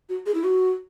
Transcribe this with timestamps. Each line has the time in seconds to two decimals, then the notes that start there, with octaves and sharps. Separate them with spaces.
0.09 F#4
0.26 G#4
0.35 E4
0.44 F#4